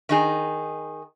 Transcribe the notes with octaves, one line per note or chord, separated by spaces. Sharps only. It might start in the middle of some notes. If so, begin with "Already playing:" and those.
D#3 D#4 G#4